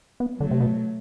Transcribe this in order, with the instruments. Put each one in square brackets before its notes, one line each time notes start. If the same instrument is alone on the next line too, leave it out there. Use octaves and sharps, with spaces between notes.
[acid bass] B3
[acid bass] D3 [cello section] F#3 A3
[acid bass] C3
B2